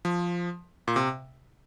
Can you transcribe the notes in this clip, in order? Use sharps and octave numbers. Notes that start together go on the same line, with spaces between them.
F3
A#2
C3